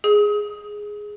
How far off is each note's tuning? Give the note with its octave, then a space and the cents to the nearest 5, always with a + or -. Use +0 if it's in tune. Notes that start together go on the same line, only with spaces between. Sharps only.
G#4 +0 D#6 +35